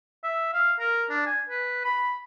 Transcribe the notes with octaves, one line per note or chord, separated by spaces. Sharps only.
E5
F5
A#4
D4
G#5
B4
B5